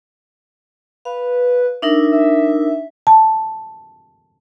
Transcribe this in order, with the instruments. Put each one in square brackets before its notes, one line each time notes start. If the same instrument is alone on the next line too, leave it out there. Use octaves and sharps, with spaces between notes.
[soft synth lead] B4 [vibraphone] F5
[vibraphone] D4 D#4 A#4 [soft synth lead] E5
[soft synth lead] E5
[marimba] A5